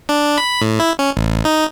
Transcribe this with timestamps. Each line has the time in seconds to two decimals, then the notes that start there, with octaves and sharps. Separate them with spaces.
0.09 D4
0.38 B5
0.61 A2
0.79 E4
0.99 C#4
1.17 A1
1.45 D#4